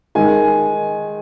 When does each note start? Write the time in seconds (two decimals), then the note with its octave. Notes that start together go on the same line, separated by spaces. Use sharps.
0.15 D#3 G#3 G#5